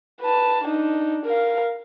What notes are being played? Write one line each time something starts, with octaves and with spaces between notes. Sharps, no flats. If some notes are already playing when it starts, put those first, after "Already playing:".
B4 A5
D4 D#4
A#4 F5